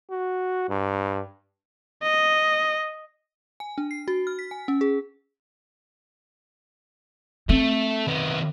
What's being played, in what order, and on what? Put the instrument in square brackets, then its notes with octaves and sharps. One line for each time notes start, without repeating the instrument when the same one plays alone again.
[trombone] F#4
G2
[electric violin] D#5
[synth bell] G#5
D4
C7
F#4
F6
B6
G#5
C#4
G#4
[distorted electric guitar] A3 [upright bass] C4
[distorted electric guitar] D#3 B3